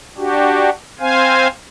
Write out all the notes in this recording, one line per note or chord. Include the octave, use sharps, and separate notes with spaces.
D4 F#4 G4
C4 C5 F5 G#5